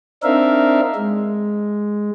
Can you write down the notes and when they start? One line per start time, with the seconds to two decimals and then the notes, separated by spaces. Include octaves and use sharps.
0.23 C4 D4 D#4 A#4 E5 F5
0.96 G#3